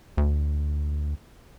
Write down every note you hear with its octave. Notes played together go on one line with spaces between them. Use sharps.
D2